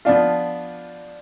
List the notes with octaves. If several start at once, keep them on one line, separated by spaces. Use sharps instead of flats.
F3 B3 D4 F4